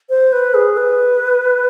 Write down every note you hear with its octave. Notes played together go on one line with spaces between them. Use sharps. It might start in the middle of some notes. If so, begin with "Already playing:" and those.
C5
B4
G#4
B4